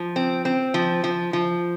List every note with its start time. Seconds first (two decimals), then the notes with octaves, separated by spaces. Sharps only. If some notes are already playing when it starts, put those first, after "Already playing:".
Already playing: F3
0.16 C4
0.45 C4
0.74 F3
1.04 F3
1.33 F3